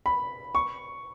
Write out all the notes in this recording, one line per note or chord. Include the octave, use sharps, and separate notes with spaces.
B5
C#6